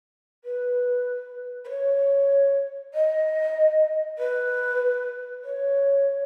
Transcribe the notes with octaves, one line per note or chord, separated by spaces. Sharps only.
B4
B4
C#5
D#5
B4
C#5